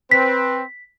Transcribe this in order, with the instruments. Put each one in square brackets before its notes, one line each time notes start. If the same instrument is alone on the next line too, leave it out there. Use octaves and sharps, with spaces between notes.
[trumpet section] C4 B4 [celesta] B6